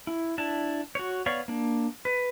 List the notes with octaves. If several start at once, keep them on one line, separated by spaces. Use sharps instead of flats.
E4
D4 E4 A5
F#4 C#5
B3 C#5 D5 F5 C#6
A#3 D4
B4